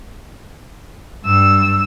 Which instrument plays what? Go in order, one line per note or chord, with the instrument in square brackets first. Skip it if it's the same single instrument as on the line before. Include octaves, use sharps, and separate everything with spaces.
[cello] G2 [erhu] E6